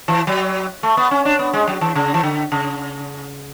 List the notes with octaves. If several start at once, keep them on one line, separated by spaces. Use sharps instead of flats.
E3
F#3
A3
B3
C#4
D4
B3
G#3
F#3
E3
C#3
E3
D3
C#3